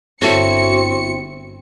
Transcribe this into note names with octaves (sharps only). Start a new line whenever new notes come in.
G1 C4 E4 F#4 A4 C#5 C#7